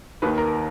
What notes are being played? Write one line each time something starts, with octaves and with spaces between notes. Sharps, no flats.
D#2 D#3 B4
A#4
A#4